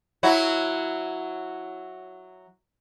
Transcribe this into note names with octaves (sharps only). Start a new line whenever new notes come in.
F#3 E4 F#4